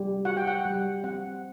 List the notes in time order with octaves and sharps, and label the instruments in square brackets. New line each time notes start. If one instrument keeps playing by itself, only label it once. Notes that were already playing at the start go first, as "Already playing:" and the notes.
Already playing: [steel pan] G3
F#4 F#5
G5
F#5
G3
C4 F#5